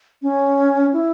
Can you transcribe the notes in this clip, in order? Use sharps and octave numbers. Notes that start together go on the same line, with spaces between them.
C#4
E4